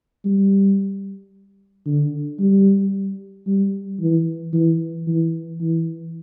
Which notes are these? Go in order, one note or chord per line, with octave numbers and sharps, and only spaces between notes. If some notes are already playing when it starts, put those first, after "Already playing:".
G3
D3
G3
G3
E3
E3
E3
E3